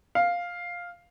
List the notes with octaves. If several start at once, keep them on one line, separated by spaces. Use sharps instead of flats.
F5